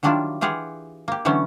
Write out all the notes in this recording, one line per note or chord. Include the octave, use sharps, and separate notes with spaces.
D#3 F#3 G3 D4 E4 F4
E3 F4 G4 G#4 F5 F#5
A#3 G4
D3 E3 F#3 A3 B3 C#4